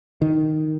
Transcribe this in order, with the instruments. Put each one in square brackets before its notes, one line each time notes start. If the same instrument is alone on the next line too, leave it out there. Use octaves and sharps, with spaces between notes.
[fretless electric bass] D#3